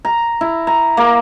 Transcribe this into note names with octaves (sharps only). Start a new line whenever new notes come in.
A#5
E4
A#5
A#3